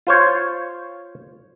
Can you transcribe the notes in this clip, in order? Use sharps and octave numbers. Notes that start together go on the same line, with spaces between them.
F4 C5 C#5